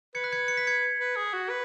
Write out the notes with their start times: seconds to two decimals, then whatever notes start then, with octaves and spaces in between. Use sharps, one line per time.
0.15 B4 G#6 C#7
0.24 F#6 B6
0.32 G#6 C#7
0.48 C#7
0.57 B6
0.67 G#6 C#7
0.99 B4
1.16 G#4
1.34 F#4
1.50 B4